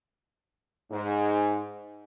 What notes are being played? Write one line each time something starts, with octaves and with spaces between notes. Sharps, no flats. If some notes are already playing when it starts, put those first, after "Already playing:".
G#2